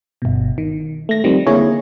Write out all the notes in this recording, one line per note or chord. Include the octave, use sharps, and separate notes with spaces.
G1 B2
D#3
A3 A#6
D#3 F3 G3 C4
D3 A#3 E4 G#4 C#5